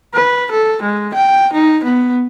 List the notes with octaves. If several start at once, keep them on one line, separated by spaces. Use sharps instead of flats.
B4
A4
G#3
G5
D#4
B3